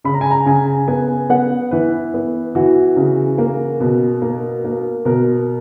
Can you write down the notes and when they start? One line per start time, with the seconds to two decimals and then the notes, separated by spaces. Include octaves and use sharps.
0.04 C#3 B5
0.14 A#5
0.21 G#5
0.31 A#5
0.46 C#3 G#5
0.88 B3 G#5
1.30 B3 F#5
1.71 E3 B4
2.14 B3
2.55 E3 F#4
2.96 C#3
3.38 A#3
3.80 B2
4.22 A#3
4.64 A#3
5.05 B2 A#4